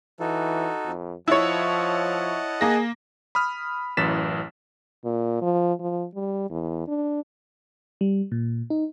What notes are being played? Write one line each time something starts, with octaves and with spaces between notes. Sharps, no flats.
E3 D#4 F#4 A4
F2
F3 E4 C#5 D#5 F#5 A5
A#3 G#4 A#6
B5 D#6 F6
A1 F#2 E3 A6 B6 E7
A#2
F3
F3
G3
E2
D4
G3
A#2
D#4